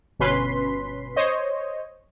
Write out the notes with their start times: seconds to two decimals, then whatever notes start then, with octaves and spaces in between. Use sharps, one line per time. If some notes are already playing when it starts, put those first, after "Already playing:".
0.19 G1 B2 C#4 B4 C6 B6
1.16 C5 C#5 D#5